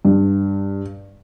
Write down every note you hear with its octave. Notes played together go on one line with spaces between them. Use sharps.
G2